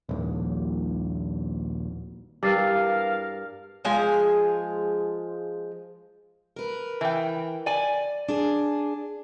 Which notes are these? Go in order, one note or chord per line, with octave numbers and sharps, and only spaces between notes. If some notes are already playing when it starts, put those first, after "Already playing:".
D#1 A#1
E2 G2 A#4 F5 D6 A6 C7
F3 G#3 G#5
A#4 B4
E3 G5
D5 G#5
D4 G#4